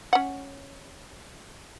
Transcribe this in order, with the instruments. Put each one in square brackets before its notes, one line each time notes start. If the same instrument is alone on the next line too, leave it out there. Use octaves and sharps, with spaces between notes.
[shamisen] C#4 F#5